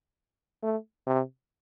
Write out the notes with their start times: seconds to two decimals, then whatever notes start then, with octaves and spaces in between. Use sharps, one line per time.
0.63 A3
1.07 C3